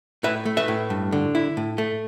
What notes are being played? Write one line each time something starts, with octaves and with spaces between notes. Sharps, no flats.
A2 B4 E5
A3
B4 E5
A2
G2
D3
E4
A2
A3